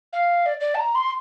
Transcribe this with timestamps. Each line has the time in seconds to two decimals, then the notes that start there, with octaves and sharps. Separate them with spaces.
0.13 F5
0.46 D5
0.61 D5
0.75 A5
0.79 A#5
0.95 C6